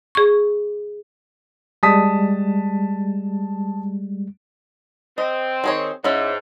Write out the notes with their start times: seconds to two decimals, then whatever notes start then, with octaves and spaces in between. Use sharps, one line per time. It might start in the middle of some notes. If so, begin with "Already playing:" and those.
0.15 G#4 C#6
1.83 G3 G#3 A5 D#6 B6
5.18 C4 D#5
5.64 D#3 G#4 C#5
6.04 G#2 C#4 E4